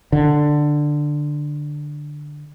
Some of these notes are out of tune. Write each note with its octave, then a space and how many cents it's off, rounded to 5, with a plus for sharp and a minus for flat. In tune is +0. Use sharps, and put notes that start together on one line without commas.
D3 +10